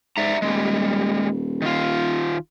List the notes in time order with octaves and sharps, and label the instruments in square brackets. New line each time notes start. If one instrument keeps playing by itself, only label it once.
[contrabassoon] G#2 [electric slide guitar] D5 E5 A#5
[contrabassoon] D#1 [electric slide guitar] G3 G#3
[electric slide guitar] D#3 F4